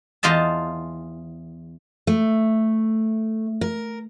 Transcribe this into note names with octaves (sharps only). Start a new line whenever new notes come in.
E2 F4 C5 D#5 A5
A3
A#4